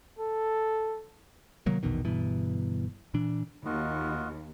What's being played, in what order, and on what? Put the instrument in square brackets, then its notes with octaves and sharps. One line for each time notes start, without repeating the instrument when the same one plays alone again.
[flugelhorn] A4
[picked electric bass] C3 D#3 F#3 A#3
A#1 E2 B2 D#3
G1 G2 B2 E3
A#2 E3 D4
[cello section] D#2 [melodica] F4 F#4 D#5